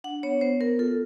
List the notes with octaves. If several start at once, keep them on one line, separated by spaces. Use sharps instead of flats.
D4 F#5
B3 C#5
B3 C5
B3 A#4
F4 A4